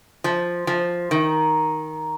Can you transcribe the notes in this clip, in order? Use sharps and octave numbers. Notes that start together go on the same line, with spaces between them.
F3
F3
D#3